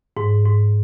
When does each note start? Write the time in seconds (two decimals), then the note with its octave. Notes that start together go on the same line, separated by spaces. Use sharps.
0.17 G#2
0.45 G#2